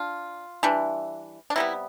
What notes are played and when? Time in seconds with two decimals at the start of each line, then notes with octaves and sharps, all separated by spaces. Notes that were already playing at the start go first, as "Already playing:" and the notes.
Already playing: D4 F4
0.63 E3 G3 D4
1.50 D4
1.56 C3 G3 B3 E4